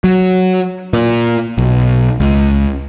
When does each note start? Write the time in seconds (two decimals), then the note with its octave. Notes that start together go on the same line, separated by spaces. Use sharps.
0.04 F#3
0.93 A#2
1.58 B1
2.20 C#2